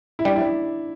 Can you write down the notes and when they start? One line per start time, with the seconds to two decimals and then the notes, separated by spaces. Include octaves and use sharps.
0.19 E4
0.25 G3 D4
0.36 E4